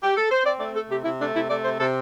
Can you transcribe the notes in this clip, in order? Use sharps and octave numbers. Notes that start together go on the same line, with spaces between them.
G4
A4
C5
C4 D5
A3 D5
A3 A4
C3 G4
C3 E4
A3 D4
C3 E4
A3 D5
C3 C5
C3 A4